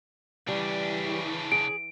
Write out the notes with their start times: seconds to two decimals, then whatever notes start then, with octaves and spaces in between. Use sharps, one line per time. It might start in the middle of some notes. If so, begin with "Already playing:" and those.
0.48 C#3 E3 G3 D4
1.52 G#4 D7